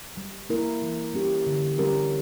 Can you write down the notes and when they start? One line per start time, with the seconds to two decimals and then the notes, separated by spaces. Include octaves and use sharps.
0.17 G3
0.49 A#3 E4 A#4
0.82 E3
1.13 G3 C#4 G4
1.46 D3
1.78 G3 C#4 G4 A#4